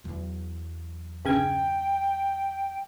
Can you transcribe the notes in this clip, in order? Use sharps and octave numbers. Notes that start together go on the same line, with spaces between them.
E2 F#3
G1 C#3 G5 G#6